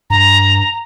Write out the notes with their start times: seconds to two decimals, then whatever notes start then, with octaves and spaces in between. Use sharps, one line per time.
0.10 G2 A#5